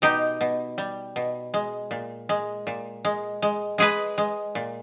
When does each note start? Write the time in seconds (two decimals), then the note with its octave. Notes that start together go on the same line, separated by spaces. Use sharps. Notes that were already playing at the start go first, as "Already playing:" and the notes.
0.02 B2 D#4 G4
0.41 B2
0.78 G3
1.16 B2
1.54 G#3
1.91 A#2
2.29 G#3
2.67 A#2
3.05 G#3
3.42 G#3
3.78 G#3 G#4 B4
4.18 G#3
4.55 A#2